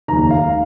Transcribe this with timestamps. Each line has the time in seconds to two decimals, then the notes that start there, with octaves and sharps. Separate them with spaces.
0.08 F1 D#2 D#3 A#5
0.31 F5